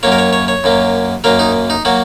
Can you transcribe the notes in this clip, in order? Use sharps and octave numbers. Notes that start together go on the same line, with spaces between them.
F#2 F#3 A#3 C#5
A#4
C#5
C#5
C#5
F#2 F#3 A#3
F#2 F#3 A#3 A#4
D#4
D#4
F#3 A#3 F#4